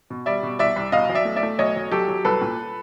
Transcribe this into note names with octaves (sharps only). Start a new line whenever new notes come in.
B2
G3 D5 E5
B2
C2 D5 E5
C2
B2 D#5 F5
B1
D5 E5
A3
D5 E5
A3
B1 C#5 D#5
B1
F#3 G4 A4
F#3
C2 A4 B4
A#2